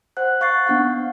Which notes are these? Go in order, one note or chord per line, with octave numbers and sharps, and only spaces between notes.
C5 F#5 F#6
F5 C#6 F#6 A6 C7
B3 D4 F5 F#5